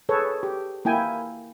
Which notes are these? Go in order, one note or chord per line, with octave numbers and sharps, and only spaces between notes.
G#4 A4 B4 C#5
G4
A#3 E4 G5 G#5